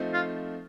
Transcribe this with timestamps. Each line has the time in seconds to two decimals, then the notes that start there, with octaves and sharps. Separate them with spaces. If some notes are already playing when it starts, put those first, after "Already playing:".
Already playing: F3 A3 C4 D#4
0.14 F4